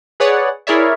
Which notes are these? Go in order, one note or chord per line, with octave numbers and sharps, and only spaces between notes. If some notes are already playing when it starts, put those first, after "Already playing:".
G#4 B4 C#5 D5 F#5
E4 G#4 A#4 C#5 D5 E5